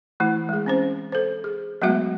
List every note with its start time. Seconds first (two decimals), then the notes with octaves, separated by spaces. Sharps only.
0.20 E3 A3 E4
0.49 G#3 G#4
0.66 C4 C#4 C5
1.12 A4 C5
1.44 G#4
1.82 F#3 G#3 A3 B3 F#4 E5